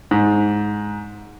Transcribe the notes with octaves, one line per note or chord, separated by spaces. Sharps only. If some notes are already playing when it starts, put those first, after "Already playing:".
G#2